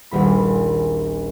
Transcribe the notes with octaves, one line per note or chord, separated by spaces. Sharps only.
D#1 A#1 B5